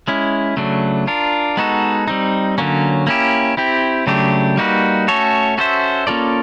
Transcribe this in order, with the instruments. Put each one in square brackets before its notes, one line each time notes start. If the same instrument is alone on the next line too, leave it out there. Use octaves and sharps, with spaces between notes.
[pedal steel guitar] G#3 C#4 E4
C#3 F#3 A3 D4
D4 F4 A#4
G#3 B3 D#4 F#4 A4
G3 C4 D#4
D3 F#3 A#3 C#4
A#3 C#4 E4 G4
C4 E4 G4
C#3 F#3 A3 D4 G4
G3 A#3 D#4 F#4 B4
A3 C#4 F#4 A4 C#5
C#4 F#4 A4 C5 E5
A#3 C#4 F4 A4 D5